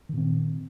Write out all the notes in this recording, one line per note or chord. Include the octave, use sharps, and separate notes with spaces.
A#2 D#3 C4